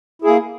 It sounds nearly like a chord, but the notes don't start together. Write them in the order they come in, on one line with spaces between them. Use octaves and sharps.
E4 G#4 A#3